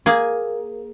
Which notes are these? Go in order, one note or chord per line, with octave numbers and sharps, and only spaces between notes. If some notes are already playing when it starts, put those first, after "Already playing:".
A#3 G#4